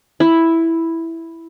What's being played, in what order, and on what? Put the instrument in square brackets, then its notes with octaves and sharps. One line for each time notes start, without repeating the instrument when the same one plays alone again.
[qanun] E4